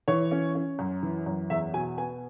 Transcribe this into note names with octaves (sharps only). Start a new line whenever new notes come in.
E3 C#5
C#4
C#4
F#2
E3
F#2
E2 E5
B2 G#5
B3 G#5